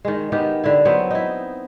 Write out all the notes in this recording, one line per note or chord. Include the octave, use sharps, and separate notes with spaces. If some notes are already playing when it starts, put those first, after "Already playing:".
D#3 G#3
D#3 B3 G4
D3 E4
F#3 B3 C4
D#4 E4